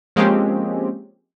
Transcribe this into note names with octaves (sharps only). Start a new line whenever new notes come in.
F3 G#3 A#3 C4 C#4 G4